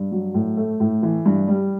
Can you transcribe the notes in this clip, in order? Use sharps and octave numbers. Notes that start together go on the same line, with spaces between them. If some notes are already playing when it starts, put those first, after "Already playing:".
Already playing: G2
F#3
A2
A3
A2
E3
G2
G3